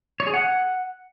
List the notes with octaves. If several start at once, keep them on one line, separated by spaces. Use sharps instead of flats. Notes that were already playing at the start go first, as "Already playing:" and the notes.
C#5
G#4
F#5